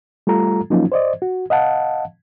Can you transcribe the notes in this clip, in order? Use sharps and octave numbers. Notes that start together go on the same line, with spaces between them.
G3 A3 F4 A4 A#5
F3 F#3 A#3 C#4 D#4 F4
C5 D5 D#5
F#4
D#5 F5 F#5 A5